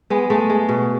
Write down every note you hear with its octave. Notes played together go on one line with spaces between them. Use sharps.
G#3 B3
G#3 A3
G#3
B2